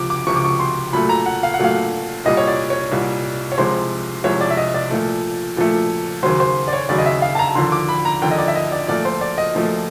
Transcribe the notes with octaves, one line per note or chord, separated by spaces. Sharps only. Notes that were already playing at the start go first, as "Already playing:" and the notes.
Already playing: C#2 C3 F3 D6
D6
C#2 C3 F3 C#6
D6
C#6
C6
A#2 F#3 A3 B5
A#5
F#5
F5
F#5
A#2 F#3 A3 F5
C2 A#2 G3 D#5
C#5
D5
C#5
C2 A#2 G3
C#5
C2 C3 F3 G#3 C5
C2 C3 F3 G#3 C#5
D5
E5
D#5
D5
A#2 F3 A3
A#2 F3 A3
D#2 C#3 F#3 C5
C5
D5
C#5
D#2 C#3 F#3 D5
D#5
E5
F5
A5
A#5
D#2 D3 F3 C6
D6
B5
A#5
D#2 D3 F3 G5
D#5
D5
E5
D#5
D5
A#2 F3 A3 D5
C5
D5
D#5
A#2 F3 A3